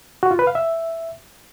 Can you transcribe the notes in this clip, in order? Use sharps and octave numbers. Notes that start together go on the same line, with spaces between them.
F#4
F4
B4
F5
E5